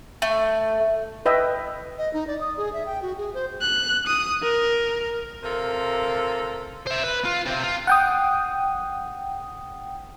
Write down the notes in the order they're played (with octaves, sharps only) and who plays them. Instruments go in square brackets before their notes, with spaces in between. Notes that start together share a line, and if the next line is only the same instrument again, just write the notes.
[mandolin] A3
[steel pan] B4 D#5 E5 G5
[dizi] D#5
D#4
D5
D#6
G#4
E5
G5
F#4
G#4
C5
[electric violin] F#6
D#6
A#4
[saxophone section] C3 F4 A4 A#4
[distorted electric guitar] C5 E5
B4
F4
C3 C4
F4
[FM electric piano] F#5 G5 D#6